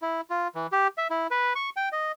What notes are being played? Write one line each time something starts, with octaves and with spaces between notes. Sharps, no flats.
E4
F4
E3
G4
E5
E4
B4
C#6
G5
D#5